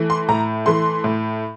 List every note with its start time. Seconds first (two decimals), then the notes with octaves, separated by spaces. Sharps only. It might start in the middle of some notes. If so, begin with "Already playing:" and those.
Already playing: E3 A3
0.10 C6
0.28 A2 A#5
0.66 E3 A3 C6
1.04 A2